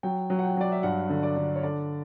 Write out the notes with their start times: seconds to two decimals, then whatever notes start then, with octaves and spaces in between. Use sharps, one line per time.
0.03 F#3 G5
0.30 F#3
0.39 F#5
0.43 G5
0.57 F#3 D5
0.72 E5
0.83 G2 F#5
1.10 D3
1.23 D5
1.36 D3
1.56 C#5
1.63 D3 D5